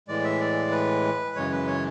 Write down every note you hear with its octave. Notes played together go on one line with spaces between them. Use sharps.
A2 E3 G#3 D5
E5
D5
B4
F#2 C#3 E3 G#3 C#5
B4
C#5